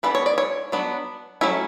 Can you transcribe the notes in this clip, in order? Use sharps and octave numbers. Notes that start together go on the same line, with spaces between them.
E3 B3 D4 B4
C#5
D5
C#5
F#3 B3 D4
F#3 A3 C#4 E4